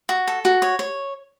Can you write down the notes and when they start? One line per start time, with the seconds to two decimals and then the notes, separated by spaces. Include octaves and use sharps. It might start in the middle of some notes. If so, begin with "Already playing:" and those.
0.09 F#4
0.27 A4
0.45 F#4
0.62 C#5
0.79 C#5